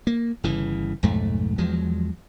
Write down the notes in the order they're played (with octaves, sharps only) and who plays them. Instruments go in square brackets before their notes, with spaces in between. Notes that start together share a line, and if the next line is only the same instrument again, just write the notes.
[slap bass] A#3
G1 C#3 E3
B1 F2 G#2 A3
E2 F3 F#3 G#3